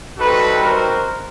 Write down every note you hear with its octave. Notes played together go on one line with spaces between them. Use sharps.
G3 C4 D#4 F#4 A4 B4
A#4 C5